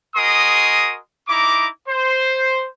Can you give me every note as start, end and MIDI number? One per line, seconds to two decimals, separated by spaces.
0.16 0.98 66
0.16 0.98 68
0.16 0.98 70
0.16 0.98 75
0.16 0.98 84
0.16 0.98 87
1.29 1.67 63
1.29 1.67 64
1.29 1.67 82
1.29 1.67 86
1.88 2.66 72